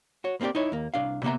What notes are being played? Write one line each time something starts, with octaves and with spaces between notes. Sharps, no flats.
F#4 C#5
A#3 C4 E4 G4 D5
D#4 E4 C#5
D#2 A#3
C2 D4 F5
C3 A#3 B3 E5 A#5